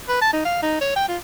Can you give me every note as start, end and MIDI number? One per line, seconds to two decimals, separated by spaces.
0.09 0.21 71
0.21 0.33 81
0.33 0.42 63
0.45 0.61 77
0.63 0.78 63
0.81 0.92 73
0.96 1.07 79
1.08 1.17 65